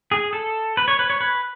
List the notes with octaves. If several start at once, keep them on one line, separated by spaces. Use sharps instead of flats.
G#4
A4
B4
C#5
B4
C#5
B4